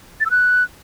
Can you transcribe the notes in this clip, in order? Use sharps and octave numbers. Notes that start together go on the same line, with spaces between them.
A6
E6
F#6